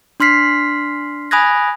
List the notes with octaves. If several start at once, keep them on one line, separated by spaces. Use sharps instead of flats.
D4 C6 F6 B6 C7
G#5 B5 D#6 F#6 G#6 A#6